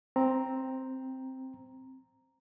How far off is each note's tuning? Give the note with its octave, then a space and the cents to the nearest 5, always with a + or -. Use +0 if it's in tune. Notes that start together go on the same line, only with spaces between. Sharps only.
C4 +0 A#5 +0